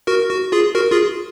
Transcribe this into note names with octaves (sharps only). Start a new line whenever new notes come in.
F#4 A#4
F#4
F4 G#4
F#4 A#4
F4 G#4